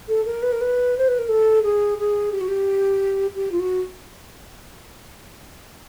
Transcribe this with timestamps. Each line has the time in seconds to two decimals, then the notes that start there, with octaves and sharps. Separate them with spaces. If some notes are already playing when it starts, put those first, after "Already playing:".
0.08 A4
0.26 A#4
0.43 B4
0.52 A#4
0.61 B4
0.98 C5
1.08 B4
1.19 A#4
1.29 A4
1.63 G#4
1.98 G#4
2.32 G4
2.41 F#4
2.48 G4
3.35 G4
3.52 F4
3.60 F#4